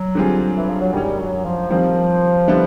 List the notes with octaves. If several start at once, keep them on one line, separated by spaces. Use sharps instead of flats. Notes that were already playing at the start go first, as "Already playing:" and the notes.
Already playing: F#3
D3 G3 C4 F4 G#4
E3
F3
F#3
F#2 D#3 G3 G#3 C#4
F#3
F3
D#3 F3 G3 C4
D3 G3 B3 E4 A4